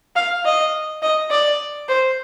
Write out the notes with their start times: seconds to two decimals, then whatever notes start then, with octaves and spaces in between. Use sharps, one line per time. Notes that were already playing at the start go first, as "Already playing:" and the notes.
0.16 F5
0.45 D#5
1.02 D#5
1.30 D5
1.88 C5